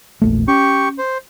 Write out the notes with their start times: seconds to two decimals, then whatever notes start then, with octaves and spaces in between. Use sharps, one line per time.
0.22 E1 A#1 A3
0.48 C#4 G4 C#6
0.98 C5